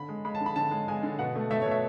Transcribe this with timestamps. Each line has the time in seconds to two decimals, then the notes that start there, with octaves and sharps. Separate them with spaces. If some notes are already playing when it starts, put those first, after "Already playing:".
Already playing: D3 B5
0.09 G#3
0.25 G#3 B5
0.35 A5
0.41 D3
0.46 B5
0.56 D3 A5
0.71 G#3
0.88 G#3 G#5
1.03 D3
1.19 B2 F#5
1.35 A3
1.51 A3 E5
1.61 C#5
1.66 B2
1.71 E5